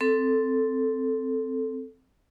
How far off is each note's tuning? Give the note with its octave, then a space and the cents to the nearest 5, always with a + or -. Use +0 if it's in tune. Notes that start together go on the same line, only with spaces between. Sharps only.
C4 -5 A4 +0